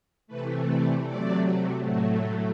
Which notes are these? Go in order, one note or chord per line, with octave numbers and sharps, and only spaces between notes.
C3 E3 A3 B4
D5
C3 F#3 A3 D5
A2 F#3 A3 F#4